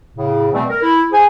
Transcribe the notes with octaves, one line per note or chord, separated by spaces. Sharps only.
A2 C#3
B2 E3 G3 A3 B3 C4
A#4
E4
G#4 C5 G#5